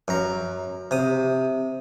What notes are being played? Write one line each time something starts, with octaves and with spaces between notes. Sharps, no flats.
F#2 A#5
C3 D#6